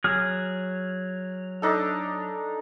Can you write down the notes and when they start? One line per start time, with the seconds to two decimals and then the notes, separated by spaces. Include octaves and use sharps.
0.04 F#3 G#4 F6
1.62 D4 D#4 A4